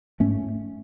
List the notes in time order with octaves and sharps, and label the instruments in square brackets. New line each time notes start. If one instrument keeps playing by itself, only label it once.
[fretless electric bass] G#2 A3 C#4